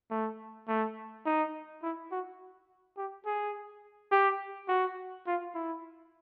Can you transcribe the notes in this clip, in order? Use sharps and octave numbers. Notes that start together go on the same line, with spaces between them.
A3
A3
D#4
E4
F#4
G4
G#4
G4
F#4
F4
E4